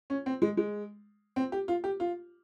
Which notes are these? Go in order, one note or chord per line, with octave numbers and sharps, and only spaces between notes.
C#4
C4
G#3
G#3
C4
G4
F4
G4
F4